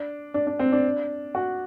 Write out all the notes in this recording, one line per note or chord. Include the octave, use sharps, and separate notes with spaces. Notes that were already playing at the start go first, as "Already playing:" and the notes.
Already playing: D4
D4
D4
C4
D4
F#4